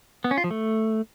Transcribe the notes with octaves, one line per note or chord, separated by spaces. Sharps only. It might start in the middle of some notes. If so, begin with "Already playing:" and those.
B3
C#4
F4
F3
A3